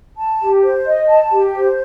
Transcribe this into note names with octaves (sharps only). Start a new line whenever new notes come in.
A5
G4
C5
D#5
A5
G4
C5